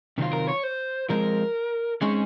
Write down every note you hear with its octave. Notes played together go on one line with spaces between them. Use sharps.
C3 D#3 F#3 C4 F4
A#4
C#5
C5
F3 G#3 C4 A#4
G#3 C4 C#4 D#4 G#4